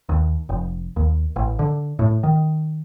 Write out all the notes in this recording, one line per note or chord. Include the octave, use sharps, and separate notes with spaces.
D#2
F1
D#2
A1
D3
A2
D#3